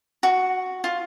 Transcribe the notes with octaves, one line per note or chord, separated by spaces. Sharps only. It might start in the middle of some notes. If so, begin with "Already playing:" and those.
F#4
F4